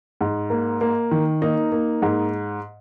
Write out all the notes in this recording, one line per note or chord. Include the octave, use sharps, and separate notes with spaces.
G#2
A#3
A#3
D#3
A#3 D#4
A#3
G#2